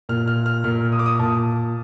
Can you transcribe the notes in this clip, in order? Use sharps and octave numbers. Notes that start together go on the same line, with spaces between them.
A#2 F6
F6
F6
A#2 F6
D#6
D6
D#6
A#2 A5